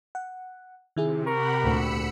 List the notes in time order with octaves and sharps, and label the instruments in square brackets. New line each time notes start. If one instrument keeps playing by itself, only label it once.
[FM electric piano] F#5
[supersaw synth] C3 [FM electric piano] D#3 E4 G#4
[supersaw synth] G4 F#5 B5 [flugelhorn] A#4 [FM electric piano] C#6
[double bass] D2 A#2 [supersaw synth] B5 E6 C#7